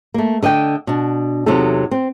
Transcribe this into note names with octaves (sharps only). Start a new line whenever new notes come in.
A3 A#3
D3 D#5 E5 G5
B2 D4
E2 C3 F#3 C4 D#4 A4
C4